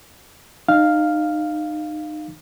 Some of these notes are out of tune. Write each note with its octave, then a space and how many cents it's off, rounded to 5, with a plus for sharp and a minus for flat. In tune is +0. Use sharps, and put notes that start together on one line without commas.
D#4 -30 F5 +0